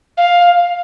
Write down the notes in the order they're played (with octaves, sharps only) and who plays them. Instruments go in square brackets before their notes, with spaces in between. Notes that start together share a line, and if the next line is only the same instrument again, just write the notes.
[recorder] F5